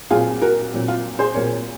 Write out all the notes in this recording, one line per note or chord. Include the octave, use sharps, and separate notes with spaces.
A#2 F#3 C4 F4 G#4
F#4 A#4
A#2 F#3 C4
F4
G#4 C5
A#2 F#3 C4 A#4 C#5